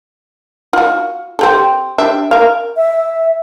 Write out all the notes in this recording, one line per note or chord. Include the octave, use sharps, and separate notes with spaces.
F4 F#4
C4 G4 A4
D4 G4 E5
A#4 F5
E5